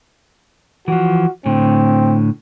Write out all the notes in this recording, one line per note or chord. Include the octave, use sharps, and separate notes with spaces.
E3 F3 F#4
A2 D3 C4